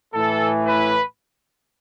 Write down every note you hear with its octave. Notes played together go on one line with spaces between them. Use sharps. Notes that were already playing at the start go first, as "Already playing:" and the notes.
A2 E3 A4
B4